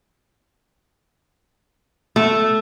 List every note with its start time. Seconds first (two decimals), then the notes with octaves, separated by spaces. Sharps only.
2.16 A3